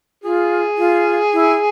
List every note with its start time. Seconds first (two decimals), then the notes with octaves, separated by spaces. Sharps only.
0.24 F4 G#4
0.78 F4
1.33 E4